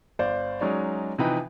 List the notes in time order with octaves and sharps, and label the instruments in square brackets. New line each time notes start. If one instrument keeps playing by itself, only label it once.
[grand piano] G1 C5 D5 F5
F#3 G#3 C#4 D#4 D5
C3 E3 F3 D#4 B4 G5